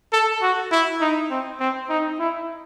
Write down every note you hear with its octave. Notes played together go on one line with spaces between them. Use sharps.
A4
F#4
E4
D#4
C4
C4
D#4
E4